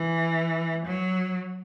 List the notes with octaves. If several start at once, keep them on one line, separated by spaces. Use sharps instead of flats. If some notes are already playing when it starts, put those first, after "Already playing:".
Already playing: E3
F#3